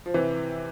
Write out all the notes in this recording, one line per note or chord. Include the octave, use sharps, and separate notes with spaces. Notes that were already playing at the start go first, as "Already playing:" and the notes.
F3
C3 E3